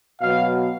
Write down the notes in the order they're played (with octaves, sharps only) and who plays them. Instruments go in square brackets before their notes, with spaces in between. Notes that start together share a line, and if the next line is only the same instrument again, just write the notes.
[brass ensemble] B2 F#3 B3 F5